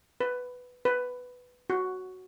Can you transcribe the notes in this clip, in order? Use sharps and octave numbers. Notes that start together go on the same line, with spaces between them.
B4
B4
F#4